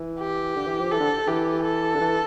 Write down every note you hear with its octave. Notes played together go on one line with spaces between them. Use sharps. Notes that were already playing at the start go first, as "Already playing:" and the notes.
Already playing: E3
G4
D3
E3
F3
E3 A4
D3
E3 G4
A4
D3
E3